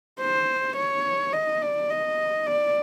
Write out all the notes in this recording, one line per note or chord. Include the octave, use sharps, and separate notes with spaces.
C5
C#5
D#5
D5
D#5
D5